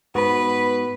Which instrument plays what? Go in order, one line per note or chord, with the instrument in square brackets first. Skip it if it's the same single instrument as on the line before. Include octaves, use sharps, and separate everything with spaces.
[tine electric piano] G#2 B3 F#4 [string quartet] B4